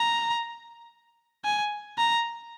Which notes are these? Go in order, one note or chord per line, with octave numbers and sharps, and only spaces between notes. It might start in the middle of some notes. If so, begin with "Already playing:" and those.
Already playing: A#5
G#5
A#5